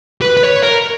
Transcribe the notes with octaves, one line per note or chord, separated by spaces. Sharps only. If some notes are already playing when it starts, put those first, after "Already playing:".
B4
B4
C#5
A#4